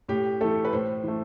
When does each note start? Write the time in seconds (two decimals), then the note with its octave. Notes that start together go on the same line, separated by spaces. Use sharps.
0.08 A2 G4
0.41 E3 A3 A4
0.65 B4
0.72 A2 C5
1.04 E3 A3